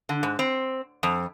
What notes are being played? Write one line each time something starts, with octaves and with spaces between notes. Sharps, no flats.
D3
G#2
C4
F2